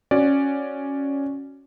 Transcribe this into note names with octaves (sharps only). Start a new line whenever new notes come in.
C#4 F#4 D5